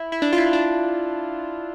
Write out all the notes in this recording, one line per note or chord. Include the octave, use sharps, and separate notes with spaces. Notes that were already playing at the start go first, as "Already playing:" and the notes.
Already playing: E4
E4
D4
F4
E4
D4